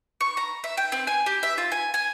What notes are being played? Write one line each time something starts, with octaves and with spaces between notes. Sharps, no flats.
C#6
A#5
E5
G5
C4
G#5
G4
E5
F4
G#5
G#5